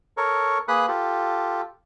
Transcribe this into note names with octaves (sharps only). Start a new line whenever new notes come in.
A4 A#4 C#5 C#6
A#3 G#4 B4 B5 D#6 F#6
F4 G4 A4